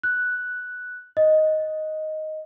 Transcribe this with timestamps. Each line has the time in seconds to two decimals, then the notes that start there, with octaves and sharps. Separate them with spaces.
0.03 F#6
1.17 D#5